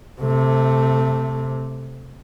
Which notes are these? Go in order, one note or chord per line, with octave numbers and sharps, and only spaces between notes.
C3 A3